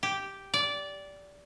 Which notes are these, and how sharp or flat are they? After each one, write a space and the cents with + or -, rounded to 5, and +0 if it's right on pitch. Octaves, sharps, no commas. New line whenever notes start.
G4 -5
D5 -15